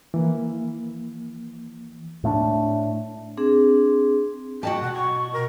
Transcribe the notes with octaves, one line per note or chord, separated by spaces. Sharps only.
E3 A#3
A2 A3 B3 D4
C4 D4 G#4
F#4 D#5 G5 A5
B2 F#5
C#6
A#4